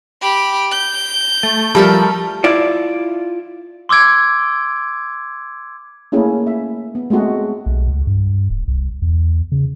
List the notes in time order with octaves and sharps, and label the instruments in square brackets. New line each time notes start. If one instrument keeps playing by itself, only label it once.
[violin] G4 B5
G6
[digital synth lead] A3
[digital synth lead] F3 [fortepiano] G3 [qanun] A3 A4 A#4
[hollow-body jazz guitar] E4 F4 D5
[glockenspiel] C6 D6 E6 G#6 D7
[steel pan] A3 A#3 C#4 E4 G#4
E5
B3
G#3 A3 C4 F#4 G#4
[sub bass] B1
C#2
G2
D1
C2
E2
C#3